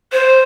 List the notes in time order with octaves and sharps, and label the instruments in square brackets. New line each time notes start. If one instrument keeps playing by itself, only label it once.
[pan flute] C5